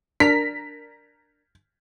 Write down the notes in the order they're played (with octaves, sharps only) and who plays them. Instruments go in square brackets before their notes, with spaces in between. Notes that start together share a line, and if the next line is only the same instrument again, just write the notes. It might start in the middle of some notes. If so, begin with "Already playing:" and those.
[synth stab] D4 A#4 A#5 [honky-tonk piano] B6